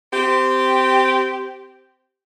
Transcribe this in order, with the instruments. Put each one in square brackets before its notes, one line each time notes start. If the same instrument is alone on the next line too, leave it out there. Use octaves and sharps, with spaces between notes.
[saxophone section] C4 G4